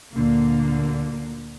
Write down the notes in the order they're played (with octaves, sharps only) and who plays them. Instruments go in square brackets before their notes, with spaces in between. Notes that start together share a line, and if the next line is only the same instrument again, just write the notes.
[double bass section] D2 A#2 D3 [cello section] A#3